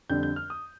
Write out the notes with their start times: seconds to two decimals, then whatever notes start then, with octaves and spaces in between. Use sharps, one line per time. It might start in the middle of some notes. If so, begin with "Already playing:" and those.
0.10 F2 D3 G3 D4 G6
0.23 G6
0.36 F6
0.50 D#6